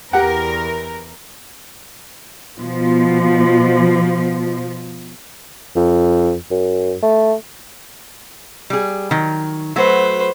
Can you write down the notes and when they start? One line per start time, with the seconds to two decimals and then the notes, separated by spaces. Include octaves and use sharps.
0.13 E2 G4 A#4 F#5
2.58 B2 F3
5.76 F2
6.51 F#2
7.02 A3
8.70 G3 G#4
9.11 D#3 F#3
9.76 F#3 A3 F#4 B4 C5